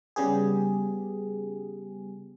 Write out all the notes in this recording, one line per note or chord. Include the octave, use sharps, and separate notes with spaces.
C#3 G3 B3 G4 G#4